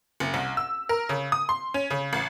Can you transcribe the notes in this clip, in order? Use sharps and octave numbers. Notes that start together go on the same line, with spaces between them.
F#1
C2
E6
A#4
C#3
D#6
C6
C#4
C#3
A1